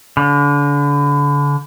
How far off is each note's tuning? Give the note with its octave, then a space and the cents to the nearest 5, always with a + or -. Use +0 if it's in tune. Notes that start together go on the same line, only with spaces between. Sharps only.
D3 -35